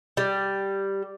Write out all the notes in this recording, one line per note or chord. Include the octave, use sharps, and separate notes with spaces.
G3